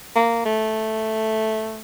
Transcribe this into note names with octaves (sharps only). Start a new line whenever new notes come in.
A#3
A3